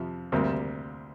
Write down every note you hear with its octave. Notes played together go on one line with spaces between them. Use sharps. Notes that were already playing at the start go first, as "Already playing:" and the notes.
Already playing: F2 C3 F3
D2 C3 G3 A#3